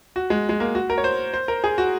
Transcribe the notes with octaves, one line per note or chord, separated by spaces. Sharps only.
F#4
G#3
G#3
A#3
F#4
A#4
C#5
C5
C5
A#4
G#4
F#4